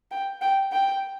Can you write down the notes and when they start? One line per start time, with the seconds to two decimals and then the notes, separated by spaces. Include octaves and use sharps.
0.11 G5
0.41 G5
0.72 G5